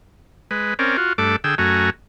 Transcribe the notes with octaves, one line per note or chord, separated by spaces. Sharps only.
G#3 B4
C4 C#4 A#4 D5
F4 F#4
G2 A3 D4 A4 D6
D3 G#4 G5 E6
F#2 A3 F#4 G#5 A#5